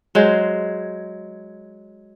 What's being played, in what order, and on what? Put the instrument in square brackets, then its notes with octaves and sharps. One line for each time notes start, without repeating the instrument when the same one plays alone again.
[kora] F#3 G#3 C5